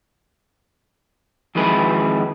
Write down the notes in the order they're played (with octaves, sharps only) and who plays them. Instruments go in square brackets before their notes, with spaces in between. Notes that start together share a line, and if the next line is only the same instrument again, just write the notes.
[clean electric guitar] F2 D#3 G#3 E4 B4